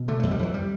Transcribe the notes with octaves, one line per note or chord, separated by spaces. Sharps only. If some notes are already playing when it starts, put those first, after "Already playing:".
Already playing: B2
D3 A3
F2 A3
G3
F2 E3
G3